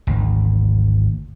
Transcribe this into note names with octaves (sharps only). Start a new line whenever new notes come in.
G#1 D2